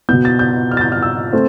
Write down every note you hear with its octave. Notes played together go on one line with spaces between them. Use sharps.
B2 B3 G6
A6
G6
F6
A6
G6
F6
E6
A3 C4